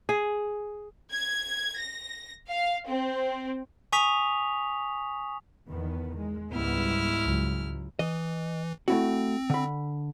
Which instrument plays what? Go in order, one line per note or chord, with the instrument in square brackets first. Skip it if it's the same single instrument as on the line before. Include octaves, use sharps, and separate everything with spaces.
[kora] G#4
[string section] G#6
A#6
F5
C4
[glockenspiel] G#5 C#6 D#6 B6 F7
[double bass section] E2 D#3 B3
G#3
[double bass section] C#2 G3 B3 [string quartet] G#2 E4 F6
[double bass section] C#2 F#3
[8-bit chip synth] E3 [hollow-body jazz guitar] D#5
[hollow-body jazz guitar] A3 E4 F#4 [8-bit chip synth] C4
[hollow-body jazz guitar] D3 B5